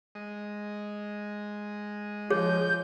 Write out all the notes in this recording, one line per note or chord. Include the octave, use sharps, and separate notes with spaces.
G#3 D#5
F3 G#4 C#5 G6